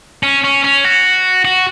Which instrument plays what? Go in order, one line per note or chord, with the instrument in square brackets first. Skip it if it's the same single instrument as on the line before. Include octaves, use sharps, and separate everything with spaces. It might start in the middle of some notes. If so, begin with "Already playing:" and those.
[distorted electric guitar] C#4
C#4
C#4
F#4
F#4